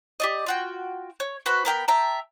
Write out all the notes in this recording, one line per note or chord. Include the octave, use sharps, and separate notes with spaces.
G4 D5 D#5
F4 F#4 G5
C#5
F#4 B4 C5 B5
B3 A#4 G5 B5
E5 G5 A5 A#5